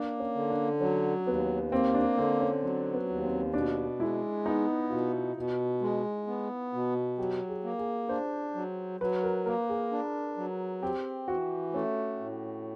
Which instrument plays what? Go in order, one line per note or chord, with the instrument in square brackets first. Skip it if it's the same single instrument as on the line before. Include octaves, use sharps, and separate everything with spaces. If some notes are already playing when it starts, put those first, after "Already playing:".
Already playing: [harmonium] A#3 [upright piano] D4
[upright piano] C#4
[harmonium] D3
[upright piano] D4
[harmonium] F#3 [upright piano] C#4
[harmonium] D#2 [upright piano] B3
[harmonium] A#3 [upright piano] C4
[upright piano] D4
[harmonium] D3 [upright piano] C4
[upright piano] C#4
[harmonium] F#3 [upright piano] C4
[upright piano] B3
[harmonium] D#2
[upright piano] C4
[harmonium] B2 [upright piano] D4
[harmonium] G#3 [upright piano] E4
[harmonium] B3 [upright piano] D#4
[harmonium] B2 [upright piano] F4
[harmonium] B2
G#3
B3
B2
[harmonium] F#3 [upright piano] G4
[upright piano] G#4
[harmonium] A#3
[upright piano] G#4
[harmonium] D4 [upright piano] C5
[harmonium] F#3
[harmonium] F#3 [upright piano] B4
[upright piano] A#4
[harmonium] A#3 [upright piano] A#4
[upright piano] G#4
[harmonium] D4
F#3
[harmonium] C4 [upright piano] G4
[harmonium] E3 [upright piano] F#4
[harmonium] A3 [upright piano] C#4
[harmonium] A2